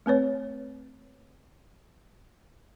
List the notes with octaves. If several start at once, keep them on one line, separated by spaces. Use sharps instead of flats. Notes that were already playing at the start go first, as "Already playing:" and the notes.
A3 C4 B4 C#5